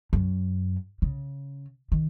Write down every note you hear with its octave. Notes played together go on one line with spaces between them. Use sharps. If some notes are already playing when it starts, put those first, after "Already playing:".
F#2
C#3
D#3